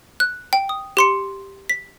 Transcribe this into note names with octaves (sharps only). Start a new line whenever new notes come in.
F#6
G5
D#6
G4 C6 C#7
B6